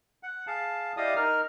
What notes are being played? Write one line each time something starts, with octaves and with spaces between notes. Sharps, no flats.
F#5
G#4 F5 A5
E4 G4 D5 D#5 F5 D#6
D#4 A#4 F6